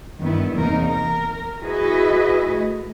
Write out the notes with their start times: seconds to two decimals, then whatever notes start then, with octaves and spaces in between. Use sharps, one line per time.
0.20 G2 D#3 B3 E4
0.55 E2 C3 A#3 D#4 A#4
0.85 A#4
1.61 E4 F#4 G#4 B4 D#5
2.49 A3